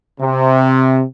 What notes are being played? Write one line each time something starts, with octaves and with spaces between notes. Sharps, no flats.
C3